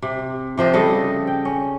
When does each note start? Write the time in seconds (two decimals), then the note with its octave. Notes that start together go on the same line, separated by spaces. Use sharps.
0.02 C3
0.58 C3 F3 C5 D#5
0.73 C#3 G3 A4 D#5
1.27 G5
1.45 C#4